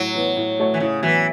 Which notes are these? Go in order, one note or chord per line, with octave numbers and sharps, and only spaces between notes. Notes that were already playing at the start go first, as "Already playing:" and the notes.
Already playing: A2 F#3
E3 B3
A2
A3 F#4 C#5
E3
A2 C#3
E3 F#3 B3